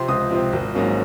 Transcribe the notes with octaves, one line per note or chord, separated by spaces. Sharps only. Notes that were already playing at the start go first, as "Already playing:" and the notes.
Already playing: C3 F3 C4 C6
C#2 D#6
C3 F3 C4
G#1
G#2 F#3 A#3 C#4